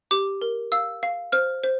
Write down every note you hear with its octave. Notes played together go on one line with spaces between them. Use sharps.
G4 D6
A#4
F5 E6
F5
C5 F6
C5